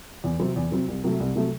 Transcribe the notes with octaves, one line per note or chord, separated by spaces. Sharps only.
E2
C3 F#3 C4
E2
C3 F#3 C4
C2
C3 F#3 A3
C2
C3 F#3 A3